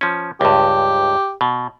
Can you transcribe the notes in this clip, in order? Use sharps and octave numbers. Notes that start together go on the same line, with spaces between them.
F3 C#4
C#2 G2 G4
B2